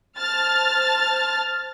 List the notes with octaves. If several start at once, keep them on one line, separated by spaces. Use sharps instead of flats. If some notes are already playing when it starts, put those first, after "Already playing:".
C5 A5 F6 A6